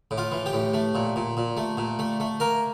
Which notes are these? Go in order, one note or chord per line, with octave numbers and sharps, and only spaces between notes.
A2
F4
E3
G4
A2
A3
A#2
A#2
A#2
A3
A#2
A3
A3
A#3 A#4